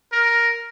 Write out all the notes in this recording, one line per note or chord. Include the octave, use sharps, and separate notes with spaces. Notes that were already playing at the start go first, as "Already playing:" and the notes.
A#4